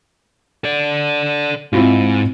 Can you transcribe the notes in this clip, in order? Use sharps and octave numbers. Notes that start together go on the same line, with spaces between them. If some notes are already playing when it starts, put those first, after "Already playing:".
A4 D5
G#2 C4 E4 F4